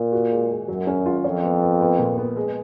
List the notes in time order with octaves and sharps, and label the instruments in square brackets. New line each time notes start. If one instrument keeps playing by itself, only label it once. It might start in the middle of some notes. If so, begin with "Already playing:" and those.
Already playing: [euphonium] A#2
[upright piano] F#4
G#3
G#3
[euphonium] F#2 [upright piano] F#3
[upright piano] C#4
F4
[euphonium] F2 [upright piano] C#5
[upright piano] B3
B3
B3
A#2
B3
G#3